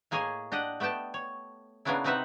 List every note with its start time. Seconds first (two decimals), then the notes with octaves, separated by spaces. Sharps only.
0.11 A2 A#3 G#4 C#5 D#5 G#5
0.52 D4 G4 D#5 F#5
0.80 A3 B3 G4 G5 A5
1.14 C#5
1.85 C#3 A#3 B3 C#4 D4 E4
2.04 C3 C4 D#4 B4 E5 F#5